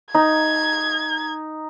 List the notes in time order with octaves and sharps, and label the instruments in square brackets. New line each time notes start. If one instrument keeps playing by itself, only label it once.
[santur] D#4 [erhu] G#6